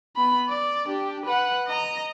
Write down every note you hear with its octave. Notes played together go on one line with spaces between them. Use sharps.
B3 B5
D5
D4 G4
B4 F#5
D#5 A#5